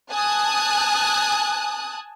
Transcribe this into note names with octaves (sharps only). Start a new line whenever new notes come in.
G#5 A5 D#6 F#6